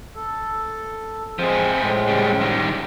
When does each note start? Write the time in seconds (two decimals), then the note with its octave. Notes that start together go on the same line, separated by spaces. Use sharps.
0.16 A4
1.39 F3 G#3 C4 G#4
1.81 A2 G#3 C4
2.08 C#3 G3
2.41 D#3 G3